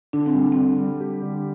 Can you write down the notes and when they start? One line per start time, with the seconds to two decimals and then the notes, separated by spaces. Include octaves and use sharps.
0.13 D3 D4
0.26 C4
0.34 G3
0.52 D3 C4
0.79 G3
1.01 G4
1.22 D3